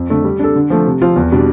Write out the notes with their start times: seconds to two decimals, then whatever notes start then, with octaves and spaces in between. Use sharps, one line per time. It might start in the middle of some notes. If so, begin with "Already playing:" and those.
Already playing: F2
0.10 D3 A3 D4
0.25 G3
0.39 D4 A4
0.56 D3
0.70 F3 A3
0.86 C3
1.02 F3 C4 F4
1.16 E2
1.32 B2 G3 D4